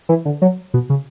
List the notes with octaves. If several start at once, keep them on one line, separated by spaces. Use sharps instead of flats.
E3
D3
F#3
B2
C#3